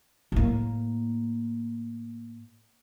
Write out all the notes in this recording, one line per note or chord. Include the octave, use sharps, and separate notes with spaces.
A2 A#3